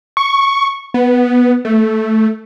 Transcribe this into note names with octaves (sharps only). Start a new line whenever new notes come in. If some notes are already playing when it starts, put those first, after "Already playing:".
C#6
B3
A3